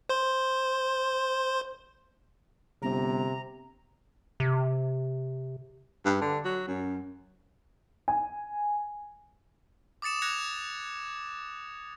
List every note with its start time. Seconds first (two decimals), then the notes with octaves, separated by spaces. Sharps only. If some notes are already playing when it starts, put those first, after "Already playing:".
0.09 C5 C6
2.82 G1 C3 A#5
4.40 C3
6.05 G2
6.21 D3
6.45 F#3
6.68 F#2
8.08 G#5
10.02 D6 D#6 A6 C#7 E7
10.22 F#6 G#6 A#6 C#7 F7